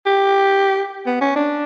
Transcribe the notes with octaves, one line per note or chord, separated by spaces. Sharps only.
G4
B3
C#4
D4